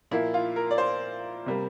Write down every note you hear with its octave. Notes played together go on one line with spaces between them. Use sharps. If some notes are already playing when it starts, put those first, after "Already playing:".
A#2 F3 A#3 E4
F4
A#4
D5
C5
C3 G3 A#3